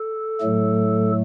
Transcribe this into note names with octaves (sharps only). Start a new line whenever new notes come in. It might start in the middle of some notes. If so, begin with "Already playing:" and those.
Already playing: A4
A2 F#3 A3